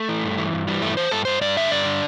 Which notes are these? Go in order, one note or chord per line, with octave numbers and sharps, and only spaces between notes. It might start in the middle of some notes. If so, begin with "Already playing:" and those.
Already playing: A3
E3
G2
E3
G2
E3 G3
G2 A3
E3 C5
G2 A4
G2 C5
G2 D5
D3 E5
G2 D5
D3